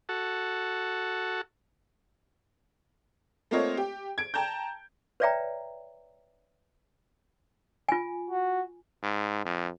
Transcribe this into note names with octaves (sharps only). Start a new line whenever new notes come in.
F#4 A4
A3 A#3 C4 F4 C#5 D#5
G4
G#6 D7
G5 A5 A#5 G6
B4 C#5 D5 E5 G5 A#5
F4 G#5
F#4
G#2
F2